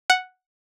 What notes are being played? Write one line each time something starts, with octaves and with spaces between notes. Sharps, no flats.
F#5